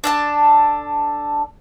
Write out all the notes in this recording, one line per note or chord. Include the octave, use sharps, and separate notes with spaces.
D4 A4 A5